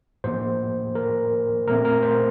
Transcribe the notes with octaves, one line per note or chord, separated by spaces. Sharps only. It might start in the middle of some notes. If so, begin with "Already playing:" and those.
A2 F3 A#3 C5
A#4
A#2 A3 C4 A#4
A#4
C5